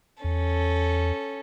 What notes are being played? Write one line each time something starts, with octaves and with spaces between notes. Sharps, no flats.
E2 C#4 A4